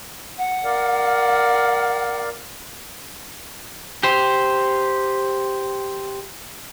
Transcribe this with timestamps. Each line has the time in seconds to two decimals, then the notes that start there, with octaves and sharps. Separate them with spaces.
0.38 F#5
0.64 A#4 D5 F5
4.03 G4 C5